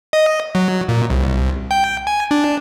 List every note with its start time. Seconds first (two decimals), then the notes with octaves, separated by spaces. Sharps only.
0.13 D#5
0.55 F#3
0.89 A#2
1.10 C2
1.71 G5
2.07 G#5
2.31 D4